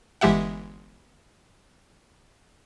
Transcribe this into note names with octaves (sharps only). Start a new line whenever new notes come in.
G1 E3 G#3 G4 E5 F#5